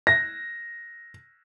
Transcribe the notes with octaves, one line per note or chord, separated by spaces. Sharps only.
A#6